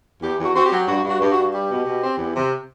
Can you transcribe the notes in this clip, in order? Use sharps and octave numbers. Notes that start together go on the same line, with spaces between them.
E2 G4
E2
F#4
C4 F#4
G4
F#3
G2 F#4
G2
F#4
G2
F#4
G2
G3 G4
B2
B2
C4
E2
C3